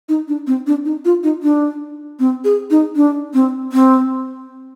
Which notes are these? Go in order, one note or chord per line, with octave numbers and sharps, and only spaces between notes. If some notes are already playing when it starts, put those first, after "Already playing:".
D#4
D4
C4
D4
D#4
F4
D#4
D4
C4
G#4
D#4
D4
C4
C4